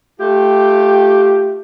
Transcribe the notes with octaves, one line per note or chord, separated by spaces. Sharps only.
A3 F4 G4